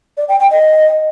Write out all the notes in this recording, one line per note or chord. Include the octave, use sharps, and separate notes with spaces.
D5
G5
G5
D#5